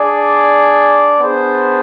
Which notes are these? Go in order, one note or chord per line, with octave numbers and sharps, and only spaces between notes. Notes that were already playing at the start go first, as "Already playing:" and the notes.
Already playing: D4 G#4 D5
B3 D4 G#4 C5